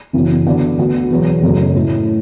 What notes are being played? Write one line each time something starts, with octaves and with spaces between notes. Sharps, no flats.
F#1 F#2 E3 B3
D3 B3 F#4 D5
D2 D3 B3 F#4
E2 B2 F#3
F#1 F#2 F#3 A3
A2 A3 E4